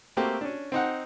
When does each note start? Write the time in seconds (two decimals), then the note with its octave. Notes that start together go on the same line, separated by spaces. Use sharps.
0.17 A3 A#3 C4 F#4 G4
0.41 C#4 D4
0.72 C4 D#4 F#5